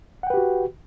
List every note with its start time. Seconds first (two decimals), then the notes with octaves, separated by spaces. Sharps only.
0.23 F#5
0.27 G5
0.30 B4
0.34 G4
0.37 F#4